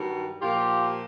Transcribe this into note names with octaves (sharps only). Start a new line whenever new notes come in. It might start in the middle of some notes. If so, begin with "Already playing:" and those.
Already playing: G2 D#3 F#3
A#2 F3 F4 G4